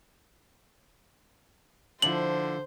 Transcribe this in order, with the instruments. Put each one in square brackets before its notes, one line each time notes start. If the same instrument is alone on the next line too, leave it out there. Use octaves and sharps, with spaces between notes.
[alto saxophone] D3 [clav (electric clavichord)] F3 E4 A5 [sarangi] C5 [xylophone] F#7